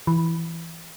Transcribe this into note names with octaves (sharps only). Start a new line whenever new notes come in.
E3